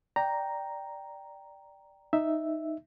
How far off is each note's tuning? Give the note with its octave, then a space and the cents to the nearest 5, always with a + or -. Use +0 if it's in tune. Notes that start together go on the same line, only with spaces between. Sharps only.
D5 +0 G5 +0 A#5 +0
D#4 +0 E5 +0